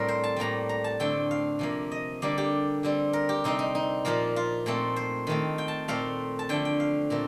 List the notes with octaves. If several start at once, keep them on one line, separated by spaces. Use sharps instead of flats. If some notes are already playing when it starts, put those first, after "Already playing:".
Already playing: A2 G3 C4 A#4
C5
A5
A2 G3 A#3 A#5
A#5
A5
D3 A3 C4 G5
F5
C3 F3 A#3
D#5
D3 G3 A#3 D5
G4
D3 G3 C4
A#4
G4
C3 G3 C4 D#4
D#4
D#4
A#2 F3 A#3 F4
F4
A#2 A3 C4
C5
D#3 A3 C4
G5
A5
A#2 A3 C4 F5
A5
D3 F3 A3 G5
G5
F5
A#2 A3 C4